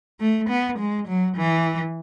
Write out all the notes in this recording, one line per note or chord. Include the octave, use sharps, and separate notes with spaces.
A3
B3
G#3
F#3
E3